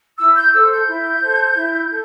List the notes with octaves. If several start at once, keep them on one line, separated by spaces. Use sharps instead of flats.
E4 E6
G6
A4 C5 E6
G6
E4
A4 C5
E4
A4